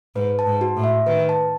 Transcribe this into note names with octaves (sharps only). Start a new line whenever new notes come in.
G#2 B4
A5
G#2
F#4
A2
E5
D#3 B4
A5